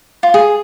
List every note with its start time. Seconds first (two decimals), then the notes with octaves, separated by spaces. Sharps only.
0.23 F4
0.34 G#4